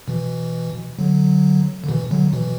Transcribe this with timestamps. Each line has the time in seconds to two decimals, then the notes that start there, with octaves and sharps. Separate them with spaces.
0.08 B2 E3
0.99 D3 F#3
1.84 D3
1.89 B2 E3
2.11 D3 F#3
2.33 B2 E3